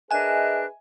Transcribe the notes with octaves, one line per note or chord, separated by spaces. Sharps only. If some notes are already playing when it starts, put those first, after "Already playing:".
D4 G#4 A#4 B4 D#5 E5 G#5 F#6